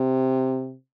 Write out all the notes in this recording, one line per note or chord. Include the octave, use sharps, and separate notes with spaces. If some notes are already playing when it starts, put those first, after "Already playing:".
Already playing: C3